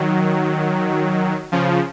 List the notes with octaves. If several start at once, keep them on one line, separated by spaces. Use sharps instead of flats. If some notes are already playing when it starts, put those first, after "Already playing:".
Already playing: D#3 F#3
C#3 F3